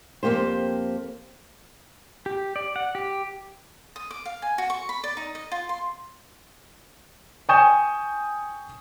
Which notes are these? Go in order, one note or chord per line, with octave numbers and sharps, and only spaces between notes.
F2 C3 A#3 G4 C5
G4
D5
F#5
G4
D#6
D6
F5
G#5
F#4
C#6
B5
D5
D#4
D#5
F4
C6
G5 G#5 C#6 D#6 G6 E7